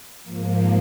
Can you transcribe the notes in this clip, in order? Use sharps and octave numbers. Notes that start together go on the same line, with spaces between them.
G#2 F3 A#3